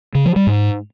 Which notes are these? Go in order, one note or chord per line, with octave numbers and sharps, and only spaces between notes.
C#3
F3
G3
G#2